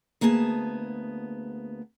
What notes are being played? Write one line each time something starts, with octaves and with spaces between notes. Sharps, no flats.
D2 A#3 B3 G#4 A5